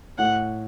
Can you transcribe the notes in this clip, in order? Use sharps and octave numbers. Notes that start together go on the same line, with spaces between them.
A2 F#5